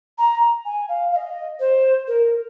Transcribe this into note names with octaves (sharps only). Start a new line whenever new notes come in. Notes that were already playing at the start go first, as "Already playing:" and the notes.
A#5
G#5
F5
F5
D#5
C5
A#4